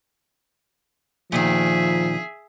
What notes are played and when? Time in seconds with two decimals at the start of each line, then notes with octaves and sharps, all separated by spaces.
1.32 A#2 D#3 F3 G#4 E5